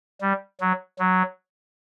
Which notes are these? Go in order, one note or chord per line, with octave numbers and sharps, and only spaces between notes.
G3
F#3
F#3